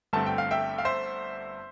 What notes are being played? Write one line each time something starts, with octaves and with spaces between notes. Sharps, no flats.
G1 G2 D3 A3 C4 A5
G5
F5
E5 G5
F5
C5 E5